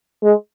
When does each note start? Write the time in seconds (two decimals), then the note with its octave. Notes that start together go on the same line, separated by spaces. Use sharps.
0.23 G#3